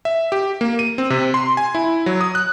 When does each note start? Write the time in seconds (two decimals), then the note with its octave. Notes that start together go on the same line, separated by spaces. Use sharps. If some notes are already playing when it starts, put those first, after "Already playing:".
0.05 E5
0.32 G4
0.61 A#3
0.79 D#7
0.98 C4
1.10 C3
1.34 C6
1.57 G#5
1.75 E4
2.06 F#3
2.21 D#6
2.35 F#6